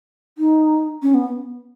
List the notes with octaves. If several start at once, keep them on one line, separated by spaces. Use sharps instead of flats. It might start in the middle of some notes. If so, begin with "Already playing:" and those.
D#4
C#4
B3